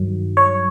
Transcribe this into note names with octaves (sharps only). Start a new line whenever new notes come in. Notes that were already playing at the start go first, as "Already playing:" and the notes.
Already playing: G2 D#3 F#3
C#5